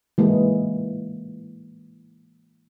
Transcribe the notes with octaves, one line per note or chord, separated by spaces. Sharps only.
E3 G#3 A#3